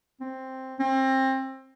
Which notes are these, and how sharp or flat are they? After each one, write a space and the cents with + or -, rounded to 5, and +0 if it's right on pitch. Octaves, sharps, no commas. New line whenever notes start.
C4 +5
C4 +25